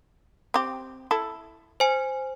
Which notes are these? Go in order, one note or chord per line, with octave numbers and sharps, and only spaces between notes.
C4 G4
E4 A4
C5 G#5